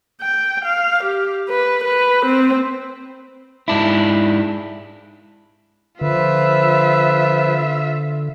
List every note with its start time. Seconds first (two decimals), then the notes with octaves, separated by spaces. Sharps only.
0.22 G5
0.65 F5
1.04 G4
1.50 B4
1.84 B4
2.26 C4
3.68 G#2 D4 E4
6.01 D3 F3 F4 B4 E5